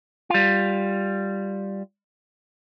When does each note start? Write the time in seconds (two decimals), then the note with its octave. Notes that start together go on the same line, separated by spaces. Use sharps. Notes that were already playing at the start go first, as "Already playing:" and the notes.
0.30 G3 F4